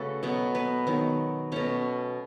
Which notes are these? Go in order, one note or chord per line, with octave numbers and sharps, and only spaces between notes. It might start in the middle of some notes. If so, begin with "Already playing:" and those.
Already playing: C#3 A3 F#4 A4 B4
B2 F#3 B3
B3 B4
D#3 F#3 B3
B2 A3 C#4 C#5